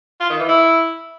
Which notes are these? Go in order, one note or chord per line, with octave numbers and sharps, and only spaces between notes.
F4
D#3
E3
E4